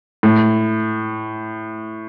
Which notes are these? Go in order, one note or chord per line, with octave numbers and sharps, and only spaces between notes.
A2